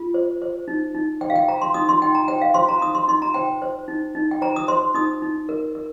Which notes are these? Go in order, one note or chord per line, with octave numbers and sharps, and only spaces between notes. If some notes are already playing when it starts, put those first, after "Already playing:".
Already playing: F4
C5
C5
D#4
D#4
C5 G5
F5
G5
C5 A#5
C6
D#4 D#6
C6
D#4 G5
A#5
C5 G5
F5
C5 C6
A#5
D#4 D#6
C6
D#4 C6
A#5
C5 G5
C5
D#4
D#4
G5
C5 A#5
D#6
C5 C6
D#4 D#6
D#4
A#4
A#4